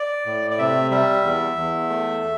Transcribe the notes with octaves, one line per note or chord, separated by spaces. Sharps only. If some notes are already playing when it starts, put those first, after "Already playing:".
Already playing: D5
A2
D5
C3 E5
G3 E5
E2
E2
A3